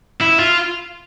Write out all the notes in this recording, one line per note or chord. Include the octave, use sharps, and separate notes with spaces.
E4
F4